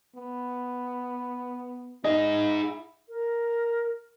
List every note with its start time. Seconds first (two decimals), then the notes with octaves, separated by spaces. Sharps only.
0.16 B3
2.04 D#4 E4 G#4 D#5
3.09 A#4